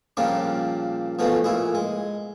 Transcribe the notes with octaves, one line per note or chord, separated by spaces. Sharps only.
A#2 C#3 F3 G3 A#3 D4
B2 E3 F3 A3
A#2 E4 G#4
G#3